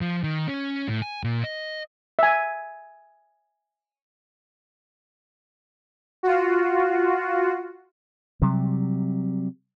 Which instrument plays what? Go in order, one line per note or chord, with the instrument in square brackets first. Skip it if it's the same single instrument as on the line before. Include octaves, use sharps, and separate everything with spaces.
[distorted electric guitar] F3
D#3
C#4
A2
G#5
A#2
D#5
[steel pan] E5 G#5
[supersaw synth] F4 F#4
[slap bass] C3 F#3 G3